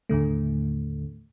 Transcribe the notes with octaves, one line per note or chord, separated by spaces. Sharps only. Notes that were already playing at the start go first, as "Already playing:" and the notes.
D#2 A2 D3 A3